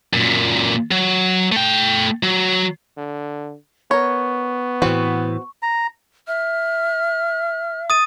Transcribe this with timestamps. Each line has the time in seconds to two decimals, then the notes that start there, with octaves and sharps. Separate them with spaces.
0.13 F#2 A#2
0.91 F#3
1.52 A3 G5
2.23 F#3
2.97 D3
3.91 B3 A#4 C#5 C#6
4.82 A2 E3 C4 F#4
5.63 A#5
6.28 E5 F6
7.90 D#6 A6 D#7